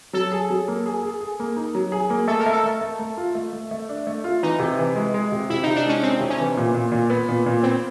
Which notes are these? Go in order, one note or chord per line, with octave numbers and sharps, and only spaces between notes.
F#3 A4
G#4
F#3
A#3
G#4
G#4
G#4
A#3
D#4
F#3
G#4
A#3
A3 A4
A#4
A3
A4
A3
A3
A3
F4
A3
A3
A3
D4
A3
F4
E3 D#4
C3
E3
G#3
G#3
C3
C3 E4
C3 D#4
D4
G#3 C#4
G#3 C4
C3
C#4
E3
A#2
A#2
A#2
B3
A#2
A#2
B3 C4